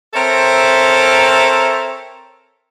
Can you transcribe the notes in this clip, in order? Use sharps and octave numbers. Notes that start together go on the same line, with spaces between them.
C4 A4 A#4 C#5 E5